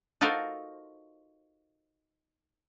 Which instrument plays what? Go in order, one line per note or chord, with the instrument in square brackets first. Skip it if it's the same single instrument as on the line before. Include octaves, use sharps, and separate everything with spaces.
[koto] D#4 F4 F#4 A4 A#4 C5